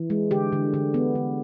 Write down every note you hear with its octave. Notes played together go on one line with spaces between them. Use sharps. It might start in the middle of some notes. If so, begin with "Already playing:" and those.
Already playing: E3
G#3
D3 G4
D3
D3
B3
D3